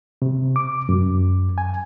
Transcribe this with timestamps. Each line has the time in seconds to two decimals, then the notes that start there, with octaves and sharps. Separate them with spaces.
0.22 C3
0.56 D6
0.89 F#2
1.58 G#5